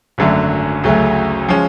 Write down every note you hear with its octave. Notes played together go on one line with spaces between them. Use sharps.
G#1 F#2 D3 F#3 A3
D2 C#3 F#3 A3 C#4
F3 G#3 C#4